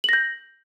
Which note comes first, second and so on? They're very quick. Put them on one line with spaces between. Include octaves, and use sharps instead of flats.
F#7 A#6 G6